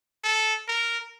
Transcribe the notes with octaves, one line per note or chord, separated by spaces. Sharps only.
A4
A#4